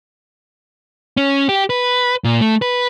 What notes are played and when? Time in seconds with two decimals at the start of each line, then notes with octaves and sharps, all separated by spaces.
1.17 C#4
1.49 G4
1.70 B4
2.24 A#2
2.41 A3
2.62 B4